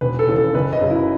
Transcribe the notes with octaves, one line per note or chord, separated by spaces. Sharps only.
E1 B4
A4
D#2 C#3 E3
A4
F#1 B4
D#5
F#2 C#3
E4